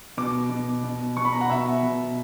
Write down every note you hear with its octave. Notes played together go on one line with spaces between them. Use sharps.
B2 D6
B2
B2
B2 C#6
B5
A#5
F#5
B2 E5
B2